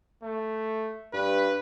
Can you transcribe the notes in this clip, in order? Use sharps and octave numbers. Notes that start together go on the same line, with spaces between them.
A3
G2 B4